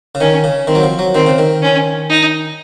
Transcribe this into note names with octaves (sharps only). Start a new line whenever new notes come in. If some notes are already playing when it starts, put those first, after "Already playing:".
C#3
D#3 C#4
C#3
D#3 C4
F#3
F3
F#3
D#3 C4
C#3
D#3
C#4
D#4